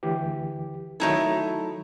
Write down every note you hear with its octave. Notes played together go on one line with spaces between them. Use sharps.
D2 E3 G4
D#3 F#3 A3 D#4 E4 A4